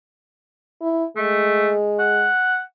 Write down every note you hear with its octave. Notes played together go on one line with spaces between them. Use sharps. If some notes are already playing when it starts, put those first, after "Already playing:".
E4
G#3 A3
F#5